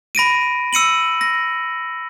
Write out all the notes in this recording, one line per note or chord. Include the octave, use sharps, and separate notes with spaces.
B5 A#6 D7 D#7
E6 C#7 D#7 F#7
A#6